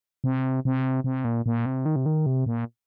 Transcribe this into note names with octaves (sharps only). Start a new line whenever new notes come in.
C3
C3
C3
A#2
A#2
C3
D#3
C3
D#3
C3
A#2